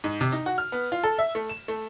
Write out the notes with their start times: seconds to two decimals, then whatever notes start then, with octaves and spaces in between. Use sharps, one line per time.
0.04 G#2
0.21 C3
0.32 D#4
0.46 F#4
0.58 F6
0.72 B3
0.92 F4
1.04 A4
1.18 E5
1.35 A3
1.49 E7
1.68 A3